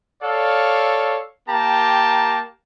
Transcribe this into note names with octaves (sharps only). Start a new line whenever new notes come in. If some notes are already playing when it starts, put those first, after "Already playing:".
A4 C#5 D5 F5
A#3 G4 G5 A5 A#5